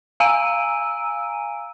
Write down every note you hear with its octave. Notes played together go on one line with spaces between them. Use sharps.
F5 G#5 A#5 E6 D7 D#7